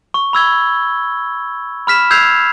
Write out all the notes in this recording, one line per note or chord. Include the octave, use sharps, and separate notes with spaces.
C#6
B5 E6 G#6 G7
B5 F6 B6 E7
E6 G6 G#6 C7 F7